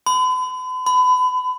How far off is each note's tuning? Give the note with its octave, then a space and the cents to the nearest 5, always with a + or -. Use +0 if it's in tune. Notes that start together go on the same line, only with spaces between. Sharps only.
B5 +45
B5 +30